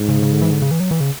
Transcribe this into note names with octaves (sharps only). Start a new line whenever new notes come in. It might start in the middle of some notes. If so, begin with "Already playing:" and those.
Already playing: G#2
C#3
C#3
D3
E3
D3
C#3
E3
F#3
E3
C#3